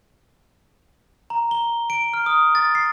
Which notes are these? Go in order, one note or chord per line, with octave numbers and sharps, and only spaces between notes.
A#5
G7
D7
F6
D#6
A6
C7